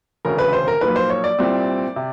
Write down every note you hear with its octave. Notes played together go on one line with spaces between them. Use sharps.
E1 D2 C#3 A#4
B4
C5
A#4
B1 A#2 F3 A#3 B4
C5
C#5
D5
C2 A#2 G3 C4
C3